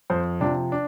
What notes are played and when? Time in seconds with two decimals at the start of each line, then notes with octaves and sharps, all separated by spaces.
0.10 F2 C5
0.41 C3 F3 D4
0.72 D4